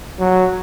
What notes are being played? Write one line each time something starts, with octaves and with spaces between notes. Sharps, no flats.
F#3